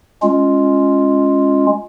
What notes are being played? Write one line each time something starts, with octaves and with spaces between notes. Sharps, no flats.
G#3 C#4 F4